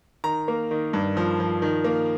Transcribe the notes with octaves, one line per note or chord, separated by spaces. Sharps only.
D#3 A#5
A#3
D#3
G2
F3
F3
D#3
A#3